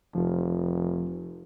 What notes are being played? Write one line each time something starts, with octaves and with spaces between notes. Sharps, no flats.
F1 F3